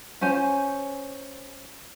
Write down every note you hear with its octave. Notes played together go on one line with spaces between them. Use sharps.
C#4 C5 G#5